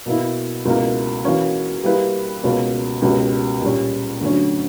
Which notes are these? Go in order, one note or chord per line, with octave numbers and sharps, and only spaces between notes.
B2 A#3 E4
C#2 B2 A#3 E4 A#4
E3 A#3 C#4 F#4
G3 A#3 E4 B4
C#2 B2 A#3 C#4
C#2 B2 A#3 C#4 G4
A#2 G3 C#4
D2 D3 F#3 C#4